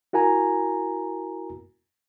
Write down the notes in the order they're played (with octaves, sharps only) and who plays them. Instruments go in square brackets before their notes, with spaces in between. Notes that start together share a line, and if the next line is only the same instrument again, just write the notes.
[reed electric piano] E4 F#4 A#4 G#5 A#5